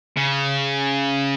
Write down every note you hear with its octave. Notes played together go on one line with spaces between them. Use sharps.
C#3